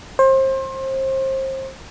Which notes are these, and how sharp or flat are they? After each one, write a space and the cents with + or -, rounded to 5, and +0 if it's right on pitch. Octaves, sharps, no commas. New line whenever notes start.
C5 +30